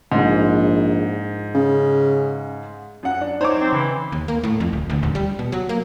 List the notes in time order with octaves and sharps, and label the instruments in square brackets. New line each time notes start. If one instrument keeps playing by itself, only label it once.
[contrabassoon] A#1 [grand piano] G#2
[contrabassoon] C#3
[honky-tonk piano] F#2 F#5
D4
[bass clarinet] F#3 [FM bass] D#4 [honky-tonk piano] C5 C#5 D6
[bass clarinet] C4
[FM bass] C#3 [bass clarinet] E3
[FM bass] D#2
A#3
A2
F2
D1
D2
D#1
G3
B2
F#3
A#3